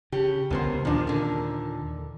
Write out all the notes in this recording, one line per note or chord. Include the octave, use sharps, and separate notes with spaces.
C#3 G4
C#2 B2 D3 B3 A#4 C5
D#2 A#2 D#3 F3 D4
D3 A#4